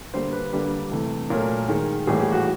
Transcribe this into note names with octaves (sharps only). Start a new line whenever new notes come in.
D3 G3 A#3 C5
B4
D3 G3 A#3 B4
C3 E3 A3
A#2 F#3 A3 A#4
D#3 G#3
A2 E3 G3 A#3 G#4
G4
F#4